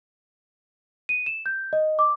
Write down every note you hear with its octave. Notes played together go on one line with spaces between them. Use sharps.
D#7
E7
G6
D#5
D6